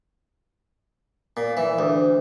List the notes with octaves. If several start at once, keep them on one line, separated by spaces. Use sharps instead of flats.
A#2
E3
D2